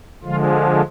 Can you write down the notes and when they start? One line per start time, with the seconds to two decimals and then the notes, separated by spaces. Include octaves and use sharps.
0.23 D3 F3 G#3 F4